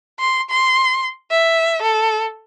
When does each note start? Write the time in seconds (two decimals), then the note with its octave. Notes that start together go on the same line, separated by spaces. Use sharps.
0.19 C6
0.50 C6
1.31 E5
1.82 A4